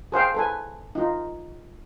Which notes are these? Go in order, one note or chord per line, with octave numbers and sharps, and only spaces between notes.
G#4 C5 F5 G5
A4 B4 G#5
D#4 F4